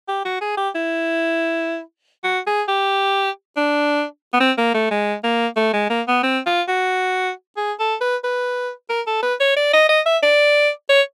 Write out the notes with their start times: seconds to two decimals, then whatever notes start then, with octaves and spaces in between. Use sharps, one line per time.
0.08 G4
0.25 F#4
0.41 G#4
0.57 G4
0.75 E4
2.24 F#4
2.47 G#4
2.68 G4
3.57 D4
4.33 B3
4.40 C4
4.58 A#3
4.74 A3
4.91 G#3
5.24 A#3
5.56 A3
5.73 G#3
5.90 A#3
6.08 B3
6.23 C4
6.46 F4
6.68 F#4
7.57 G#4
7.80 A4
8.01 B4
8.24 B4
8.89 A#4
9.07 A4
9.23 B4
9.40 C#5
9.56 D5
9.73 D#5
9.89 D#5
10.06 E5
10.23 D5
10.90 C#5